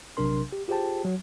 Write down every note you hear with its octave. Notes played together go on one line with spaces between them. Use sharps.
A#1 C3 F#3 D4 A#4 C6
G4
F4 G4 G#4 C5 G5 A5
F#3